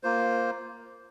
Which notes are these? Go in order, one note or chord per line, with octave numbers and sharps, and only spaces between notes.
A#3 F4 C5